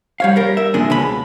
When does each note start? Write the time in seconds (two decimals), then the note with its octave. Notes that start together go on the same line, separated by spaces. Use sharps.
0.20 G3 C#5 F5
0.36 G3 A#4
0.57 E5
0.74 D#2 A#2 G#3 D4 G#4
0.90 C#2 B2 G#3 B5